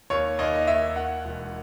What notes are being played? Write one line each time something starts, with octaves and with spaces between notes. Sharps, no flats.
D#2 C#5
D#2 D#5
D#5
D#2 E5
D#3 F#5
E1